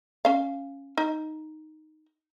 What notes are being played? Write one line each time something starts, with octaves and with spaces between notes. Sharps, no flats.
C#4 F5
D#4